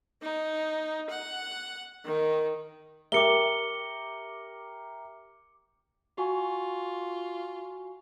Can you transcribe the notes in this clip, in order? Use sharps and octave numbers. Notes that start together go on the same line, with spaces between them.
D#4
F#5
D#3
G4 A#4 E5 D6 C#7 G7
F4 F#4 G#5 C#6